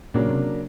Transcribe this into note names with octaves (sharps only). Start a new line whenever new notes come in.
A#2 C#3 F#3 A#3 D4
C3